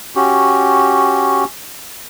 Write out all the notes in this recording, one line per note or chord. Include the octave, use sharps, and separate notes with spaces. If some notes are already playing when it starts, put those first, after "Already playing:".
C#4 F#4 G4